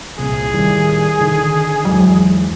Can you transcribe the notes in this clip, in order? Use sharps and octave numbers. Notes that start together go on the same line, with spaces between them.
C2 A#2 G#4
A2 D#3 G3
D3 D#3
E2 G#2 F#3